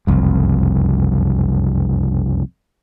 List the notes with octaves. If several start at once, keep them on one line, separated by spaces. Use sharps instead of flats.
F#1 C2 F2